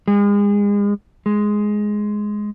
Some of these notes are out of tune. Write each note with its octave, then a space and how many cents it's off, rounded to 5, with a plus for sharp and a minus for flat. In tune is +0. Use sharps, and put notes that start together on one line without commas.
G#3 -35
G#3 +5